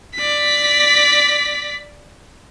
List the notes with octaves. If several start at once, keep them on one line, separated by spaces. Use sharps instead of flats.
D5 B6